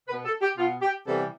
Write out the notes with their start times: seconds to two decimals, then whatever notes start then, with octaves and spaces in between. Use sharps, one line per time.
0.08 B2 B3 B4
0.25 A4
0.42 G4
0.58 B2 B3 F4
0.82 G4
1.07 C3 E3 G3 B3 A4